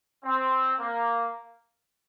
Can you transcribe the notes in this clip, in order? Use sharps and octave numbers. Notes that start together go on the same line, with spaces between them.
C4
A#3